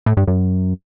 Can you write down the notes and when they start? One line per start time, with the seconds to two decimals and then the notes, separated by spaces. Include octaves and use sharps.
0.06 A2
0.17 G2
0.27 F#2